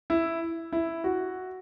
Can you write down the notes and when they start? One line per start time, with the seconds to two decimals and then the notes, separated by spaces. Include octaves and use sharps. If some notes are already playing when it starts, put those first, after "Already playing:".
0.10 E4
0.73 E4
1.04 F#4